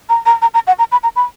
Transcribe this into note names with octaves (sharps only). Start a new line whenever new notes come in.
A#5
A#5
A#5
A#5
F#5
A#5
B5
A#5
B5